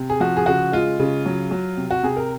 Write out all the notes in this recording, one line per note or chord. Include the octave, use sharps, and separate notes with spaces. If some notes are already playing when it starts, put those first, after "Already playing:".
Already playing: C3
G#4
F3 F#4
G#4
C#3 F#4
G#3 F4
C#3
F#3
F#3
C3
F#4
C3 G#4
A#4